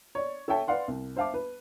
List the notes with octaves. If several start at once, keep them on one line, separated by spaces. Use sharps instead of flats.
C#5 D5
A4 C#5 E5 G5 A5
B4 D5 F5 F#5 C6
C2
C5 E5 F5 A5 D6
B4